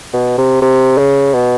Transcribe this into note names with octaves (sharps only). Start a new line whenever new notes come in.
B2
C3
C3
C#3
B2